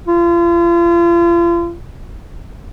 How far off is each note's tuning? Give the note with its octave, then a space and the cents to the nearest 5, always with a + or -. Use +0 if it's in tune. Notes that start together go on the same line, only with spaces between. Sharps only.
F4 -40